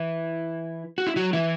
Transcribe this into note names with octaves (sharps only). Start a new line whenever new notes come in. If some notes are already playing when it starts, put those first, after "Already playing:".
Already playing: E3 E4
F#4
E4
F#3 F#4
E3 E4